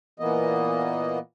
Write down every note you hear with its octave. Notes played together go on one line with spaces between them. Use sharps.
A#2 E3 A#3 B3 D#5